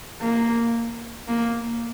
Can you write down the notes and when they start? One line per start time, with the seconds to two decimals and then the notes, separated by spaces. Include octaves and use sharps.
0.22 A#3
1.28 A#3